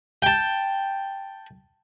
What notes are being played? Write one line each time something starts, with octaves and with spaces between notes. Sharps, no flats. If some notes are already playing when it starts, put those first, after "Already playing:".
G5 A5